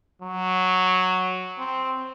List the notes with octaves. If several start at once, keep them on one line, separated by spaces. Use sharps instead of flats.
F#3
C4